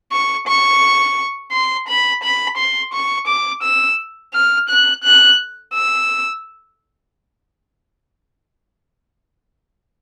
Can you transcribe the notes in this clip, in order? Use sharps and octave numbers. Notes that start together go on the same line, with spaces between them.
C#6
C#6
C6
B5
B5
C6
C#6
D6
E6
F6
F#6
F#6
E6